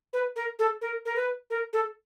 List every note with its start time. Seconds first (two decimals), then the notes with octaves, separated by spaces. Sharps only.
0.13 B4
0.36 A#4
0.59 A4
0.82 A#4
1.06 A#4
1.16 B4
1.50 A#4
1.73 A4